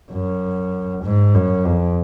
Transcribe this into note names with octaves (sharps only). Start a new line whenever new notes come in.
F#2
G#2
F#2
F2